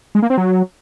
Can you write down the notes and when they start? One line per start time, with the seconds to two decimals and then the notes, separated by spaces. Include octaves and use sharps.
0.15 G#3
0.22 A#3
0.30 C4
0.37 F#3